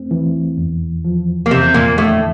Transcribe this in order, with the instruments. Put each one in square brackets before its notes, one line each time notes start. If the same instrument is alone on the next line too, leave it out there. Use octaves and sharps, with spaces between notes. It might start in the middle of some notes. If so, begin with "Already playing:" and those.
Already playing: [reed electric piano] E2 A3 C4
E3
E2
F3
[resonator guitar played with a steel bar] A#3
[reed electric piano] E2 [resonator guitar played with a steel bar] C3 C4
[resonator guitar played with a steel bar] A#2 A#3
[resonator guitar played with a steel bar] A2 A3 [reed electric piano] D3